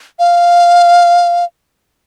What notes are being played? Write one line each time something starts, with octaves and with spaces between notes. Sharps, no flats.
F5